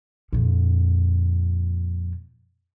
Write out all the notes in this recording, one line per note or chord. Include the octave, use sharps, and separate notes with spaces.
F2 A#2